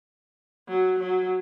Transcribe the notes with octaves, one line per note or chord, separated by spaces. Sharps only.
F#3
F#3